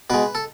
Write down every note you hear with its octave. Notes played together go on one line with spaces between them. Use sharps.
B2 G#3 B4
A4